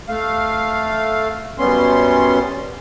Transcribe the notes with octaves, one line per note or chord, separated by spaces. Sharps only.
A3 F5
F#2 G3 B3 C#4 C6